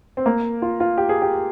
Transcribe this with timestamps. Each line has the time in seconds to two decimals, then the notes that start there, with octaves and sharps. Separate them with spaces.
0.17 C4
0.26 A#3
0.62 F4
0.80 F4
0.98 G4
1.09 G#4
1.22 G4